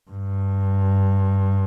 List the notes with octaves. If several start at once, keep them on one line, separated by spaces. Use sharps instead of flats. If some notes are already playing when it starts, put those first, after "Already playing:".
G2